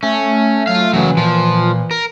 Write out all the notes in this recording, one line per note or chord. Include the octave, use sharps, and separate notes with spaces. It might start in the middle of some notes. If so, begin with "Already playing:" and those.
A3 C#4
F#3 F4 F5
C#3 E3 F#3
A#2 F3
A#4